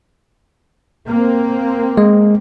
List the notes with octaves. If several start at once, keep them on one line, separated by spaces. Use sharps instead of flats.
A#3 C4
G#3